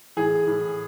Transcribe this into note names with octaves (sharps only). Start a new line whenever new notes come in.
A2 E3 G#4
A2 E3